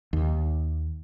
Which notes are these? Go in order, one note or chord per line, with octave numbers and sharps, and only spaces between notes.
D#2